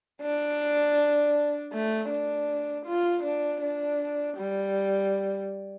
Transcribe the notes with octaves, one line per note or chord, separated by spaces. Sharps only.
D4
A3
D4
F4
D4
D4
G3